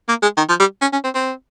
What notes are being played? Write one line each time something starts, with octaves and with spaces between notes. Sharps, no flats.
A#3
G#3
D#3
F3
G3
C#4
C#4
C4
C4